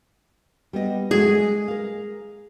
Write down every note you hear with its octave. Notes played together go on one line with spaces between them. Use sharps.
G3 B3 D#5
G#3 A3 F#4 G#4
G#3
A#4 F5